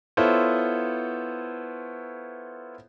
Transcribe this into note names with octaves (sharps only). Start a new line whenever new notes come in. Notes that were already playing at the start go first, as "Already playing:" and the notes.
B3 E4 F4 A4 C5 C#5